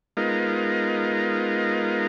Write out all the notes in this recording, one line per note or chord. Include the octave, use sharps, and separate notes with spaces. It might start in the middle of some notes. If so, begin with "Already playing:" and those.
G#3 B3 D#4 F4 A#4